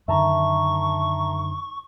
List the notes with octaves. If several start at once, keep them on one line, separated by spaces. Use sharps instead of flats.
F#2 D3 D#3 E5 A5 A#5 C#6